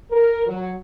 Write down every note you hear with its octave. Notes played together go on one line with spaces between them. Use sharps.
A#4
F#3